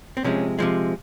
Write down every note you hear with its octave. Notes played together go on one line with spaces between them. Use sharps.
C4
C3 F3 G#3 C#4
C3 F3 G#3